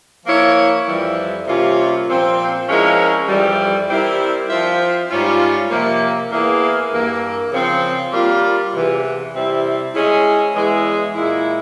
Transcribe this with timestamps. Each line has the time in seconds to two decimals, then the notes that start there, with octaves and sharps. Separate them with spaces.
0.25 F3 A#3 E4 A#4 C#5
0.86 F2 E3 G3
1.46 C3 G3 A#3 C#4 F4
2.07 A#2 F3 C4
2.68 F3 G#3 C#4 E4 A#4
3.28 F2 E3 G3
3.88 G3 C4 E4 A#4
4.49 F3 C4 F4 C5 E5
5.09 G#2 G3 C#4 F4
5.70 C3 F3 A#3
6.30 E2 E3 A#3 E4 G#4
6.90 G2 E3 A#3
7.51 C#3 F3 C4
8.12 G3 A#3 F4
8.73 E2 C3 E3
9.34 C3 G3 C4 E4
9.94 G#3 C#4 E4 G#4
10.54 E2 E3 G#3 E4 G#4
11.15 A#2 G#3 E4